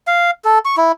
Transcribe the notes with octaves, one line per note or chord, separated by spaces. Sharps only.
F5
A4
C#6
E4